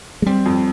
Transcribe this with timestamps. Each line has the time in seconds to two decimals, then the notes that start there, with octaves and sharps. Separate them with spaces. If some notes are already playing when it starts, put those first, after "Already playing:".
0.22 G#3
0.26 G3 C4
0.46 F2